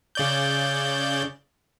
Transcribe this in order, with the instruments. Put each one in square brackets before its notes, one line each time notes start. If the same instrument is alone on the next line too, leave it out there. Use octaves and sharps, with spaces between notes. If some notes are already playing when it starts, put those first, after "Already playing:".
[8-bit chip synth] C#3 D5 G6